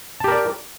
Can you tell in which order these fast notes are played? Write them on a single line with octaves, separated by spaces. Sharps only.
A5 G4 A#4 D5